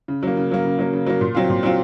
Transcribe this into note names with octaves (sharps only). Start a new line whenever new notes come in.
C#3
F#3 A#3
C#3
F#3 A#3
C#3
F#3 A#3
C#3
F#3 A#3
A#2
F#3 C4 F4
A#2
F#3 C4 F4